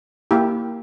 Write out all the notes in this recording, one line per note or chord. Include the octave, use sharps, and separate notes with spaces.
A#3 E4 G4